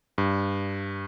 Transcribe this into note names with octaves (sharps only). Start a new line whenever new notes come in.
G2